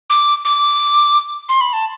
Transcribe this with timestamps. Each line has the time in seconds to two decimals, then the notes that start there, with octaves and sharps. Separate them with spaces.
0.10 D6
0.45 D6
1.49 C6
1.61 B5
1.73 A5